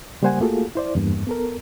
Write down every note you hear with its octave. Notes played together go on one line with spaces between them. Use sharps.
C#3 G3 A#3 C5 F#5 G#5
A3 A#3 F4 F#4 G#4 A4
E4 C5 D5
E2 G2 A#3
B3 A4 A#4